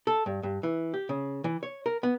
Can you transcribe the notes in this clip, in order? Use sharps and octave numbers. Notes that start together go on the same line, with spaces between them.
A4
G2
G2
E3
G4
C#3
E3
C#5
A#4
B3